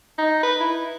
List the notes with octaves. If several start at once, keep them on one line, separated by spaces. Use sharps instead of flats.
D#4
B4
E4